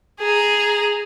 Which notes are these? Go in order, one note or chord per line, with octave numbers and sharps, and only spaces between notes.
G#4 A#5